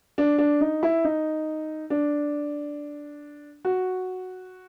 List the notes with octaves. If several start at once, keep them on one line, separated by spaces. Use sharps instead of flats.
D4
D4
D#4
E4
D#4
D4
F#4